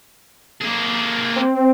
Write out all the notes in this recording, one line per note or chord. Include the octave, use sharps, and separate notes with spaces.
A#3 G#4
C4